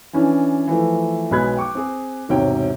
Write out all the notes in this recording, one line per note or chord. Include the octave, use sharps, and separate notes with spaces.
E3 C#4 D4
E3 F3 A3
B1 G#3 B3 B5 F#6 G#6
G5 C#6 D6
C4 G#4
E1 G#2 C3 C#5 G5